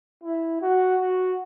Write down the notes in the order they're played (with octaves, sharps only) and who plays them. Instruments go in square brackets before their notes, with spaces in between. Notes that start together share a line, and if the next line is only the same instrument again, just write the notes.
[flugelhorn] E4
F#4
F#4